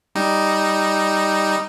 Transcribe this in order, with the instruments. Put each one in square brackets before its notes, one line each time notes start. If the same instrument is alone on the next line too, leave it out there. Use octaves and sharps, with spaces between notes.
[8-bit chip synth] G3 D#4